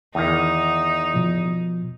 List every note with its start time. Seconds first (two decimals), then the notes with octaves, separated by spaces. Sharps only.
0.15 E2 D#3 D#4
1.14 B2 F3